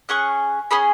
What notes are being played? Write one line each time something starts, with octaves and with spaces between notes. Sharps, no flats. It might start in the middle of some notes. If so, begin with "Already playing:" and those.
C#4 G#4 C#6 F#6
C#4 G#4 B5 D#6